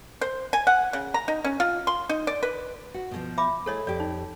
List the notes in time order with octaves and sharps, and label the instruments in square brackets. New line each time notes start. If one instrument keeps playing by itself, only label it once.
[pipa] C5
G#5
F#5
C#3
A#5
D#4
C#4
F4
C6
D#4
D5
B4
[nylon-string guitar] F#4
B2 D3 F3
[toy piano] E5 B5 D6
[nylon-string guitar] A3 E4 G#4 [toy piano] A4 C#5 D#5
[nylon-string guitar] F2 G4 [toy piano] D5
[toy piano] D#4